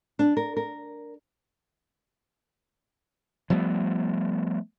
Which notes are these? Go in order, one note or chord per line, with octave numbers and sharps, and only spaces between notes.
D4
A#4
A#4
F3 G3 A3 B3